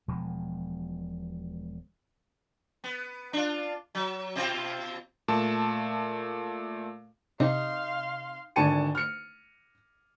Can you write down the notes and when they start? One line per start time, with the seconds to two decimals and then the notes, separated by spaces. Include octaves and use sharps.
0.08 E1 B2 F3 G#3
2.84 B3
3.33 D4 F4
3.95 F#3
4.36 B2 C4 F4
5.28 A#2 A3 A5
7.40 C3 D#4 F5 C6
8.56 G#1 D3 G#5 A5 C#7 D#7
8.95 F6 C#7